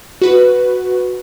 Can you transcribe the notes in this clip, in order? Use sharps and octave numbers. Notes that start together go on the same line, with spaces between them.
F#4 B4